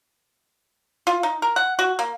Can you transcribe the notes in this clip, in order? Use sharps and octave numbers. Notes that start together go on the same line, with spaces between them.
F4
D#4
A#4
F#5
F#4
A#3